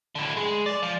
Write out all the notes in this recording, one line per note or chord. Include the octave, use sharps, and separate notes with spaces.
D3 E4
G#3
D5
F3